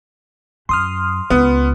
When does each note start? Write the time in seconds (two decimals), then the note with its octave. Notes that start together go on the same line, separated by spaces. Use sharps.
0.69 F#2 C6 D#6 F6
1.30 C#2 B3